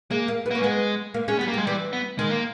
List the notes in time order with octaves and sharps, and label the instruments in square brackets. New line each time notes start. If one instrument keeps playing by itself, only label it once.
[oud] G#3 [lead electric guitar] A#3
[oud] A#3
B3
[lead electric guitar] A#3 [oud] C#4
[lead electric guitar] G#3 [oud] B3
[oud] A#3
[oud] G#3 [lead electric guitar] C#4
[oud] G3 [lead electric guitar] B3
[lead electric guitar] A#3
[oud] G3
[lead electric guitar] G#3
[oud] E3 [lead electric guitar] G3
[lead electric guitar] B3
[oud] D#3 [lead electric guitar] G#3
[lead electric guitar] A#3